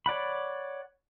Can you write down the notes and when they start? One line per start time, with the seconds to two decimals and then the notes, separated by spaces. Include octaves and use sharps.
0.06 C#5 D5 F#5 B5